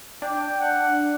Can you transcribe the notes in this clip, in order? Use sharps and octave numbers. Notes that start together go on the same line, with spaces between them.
D4 G5
F#5